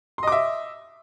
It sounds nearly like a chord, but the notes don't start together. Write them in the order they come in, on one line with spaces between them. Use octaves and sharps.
C6 D#5 D6 E5